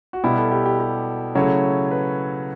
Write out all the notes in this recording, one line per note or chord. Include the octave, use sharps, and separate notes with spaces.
F#4
B2 G3 B3 E4 G4
A4
G4
G4
G4
C#3 F#3 A3 E4 C#5
B4